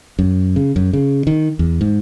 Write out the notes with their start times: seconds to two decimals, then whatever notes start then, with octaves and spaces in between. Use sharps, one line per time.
0.19 F#2
0.56 C#3
0.76 F#2
0.93 C#3
1.27 D#3
1.59 E2
1.81 G#2